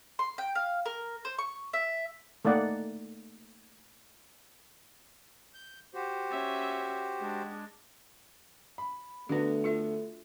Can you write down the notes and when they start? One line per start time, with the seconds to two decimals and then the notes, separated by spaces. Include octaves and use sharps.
0.19 C6
0.38 G5
0.55 F5
0.86 A#4
1.25 C5
1.38 C#6
1.73 E5
2.45 A3 A#3 D#4 D5 F#5
5.54 G6
5.94 F#4 G4 C5
6.31 C#4 E5
7.19 G#3 D4
8.78 B5
9.29 D3 A3 B3 D4 F#4
9.64 F4 A4 E5